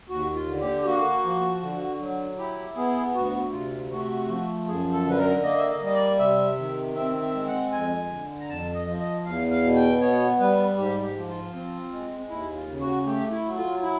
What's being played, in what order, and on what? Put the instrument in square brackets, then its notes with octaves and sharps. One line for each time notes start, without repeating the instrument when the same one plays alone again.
[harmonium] D#2 F#4
F4
D3
G4
G4
A#3 F#4
F3
D3
F#3
E4 G4
B3 G#4
D2 F#4
C3 F4
A3 F#4
F3
F#2 G#4
A4
D3 B4
A#4
A#3 D#5
E5
D#5
G3 D#5
D5
C3 E5
D#3
C4 E5
E5
G#3
F#5
F2 G#5
D3
A#5
F2 A5
D#5
F3
D#5
E2 F5
F5
B2
G5
B3 C#5
G3 B4
G#2 G4
G4
F3
F4
C4
G#3
D#2 E4
F4
C#3
F#4
A3 G4
E4
F#3
F4
E4